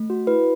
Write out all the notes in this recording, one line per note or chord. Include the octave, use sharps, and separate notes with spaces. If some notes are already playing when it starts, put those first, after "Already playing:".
Already playing: A3
F#4
E4 B4